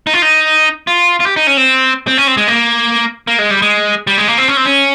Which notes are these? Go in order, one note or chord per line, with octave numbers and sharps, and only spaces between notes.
D#4
F4
D#4
F4
F4
G4
D#4
C#4
C4
C4
C#4
C4
G#3
A#3
A#3
G#3
G3
G#3
G3
G#3
A#3
C4
C#4
C4
C#4